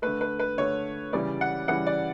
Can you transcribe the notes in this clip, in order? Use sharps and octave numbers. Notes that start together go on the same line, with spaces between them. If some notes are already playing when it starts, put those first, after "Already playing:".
D3 A3 B4
B4
B4
D3 A3 C#5
C#3 E3 G3 D5
F#5
C#3 E3 G3 F#5
D5